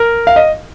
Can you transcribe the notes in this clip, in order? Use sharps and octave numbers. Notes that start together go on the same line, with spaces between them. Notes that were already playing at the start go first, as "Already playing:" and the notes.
Already playing: A#4
F5
D#5